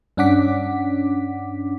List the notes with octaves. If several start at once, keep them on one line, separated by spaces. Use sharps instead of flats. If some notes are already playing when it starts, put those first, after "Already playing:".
G2 C#4 D4 F#5 D6 B6